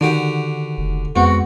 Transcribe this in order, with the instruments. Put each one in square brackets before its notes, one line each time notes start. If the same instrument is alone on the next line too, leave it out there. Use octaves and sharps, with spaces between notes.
[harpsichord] D3 F#4 G4 [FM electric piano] D#3
[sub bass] F1
[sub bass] F2 [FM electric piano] G#3 B3 [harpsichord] C4 [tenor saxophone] F#4